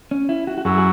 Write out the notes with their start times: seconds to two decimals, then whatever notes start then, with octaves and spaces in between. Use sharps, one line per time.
0.11 C#4
0.29 E4
0.47 F#4
0.58 F#4
0.65 F#2 F#3 C#4 E4 G#4
0.78 G#4